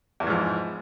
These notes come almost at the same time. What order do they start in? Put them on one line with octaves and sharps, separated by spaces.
E2 E3 G#2 F3